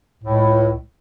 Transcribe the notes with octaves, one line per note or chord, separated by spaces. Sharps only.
C#2 A2